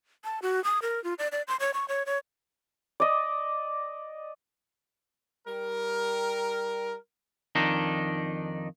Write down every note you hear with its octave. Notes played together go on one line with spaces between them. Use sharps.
A5
F#4
D#6
A#4
F4
D5
D5
C6
C#5
C#6
C#5
C#5
D5 D#5
G3 A#4
F2 D#3 D4 D#4